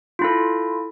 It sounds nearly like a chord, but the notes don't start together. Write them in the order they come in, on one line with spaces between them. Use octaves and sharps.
F4 E4 A4